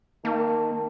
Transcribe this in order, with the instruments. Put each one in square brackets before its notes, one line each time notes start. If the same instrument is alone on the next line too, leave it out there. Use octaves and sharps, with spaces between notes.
[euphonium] D#3 [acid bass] A#3 [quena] A5